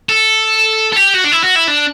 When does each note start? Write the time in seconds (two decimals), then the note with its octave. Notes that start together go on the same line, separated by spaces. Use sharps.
0.09 A4
0.93 A4
0.97 G4
1.14 F#4
1.25 D4
1.32 E4
1.44 F#4
1.56 E4
1.68 D4